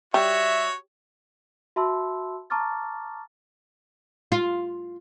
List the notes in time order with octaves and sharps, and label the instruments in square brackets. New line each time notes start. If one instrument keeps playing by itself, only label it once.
[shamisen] G3 [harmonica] F#4 C#5 [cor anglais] E5
[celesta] F#4 E5 A5 B5 C6 E6
A5 A#5 C#6 D6 F6 A6
[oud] F4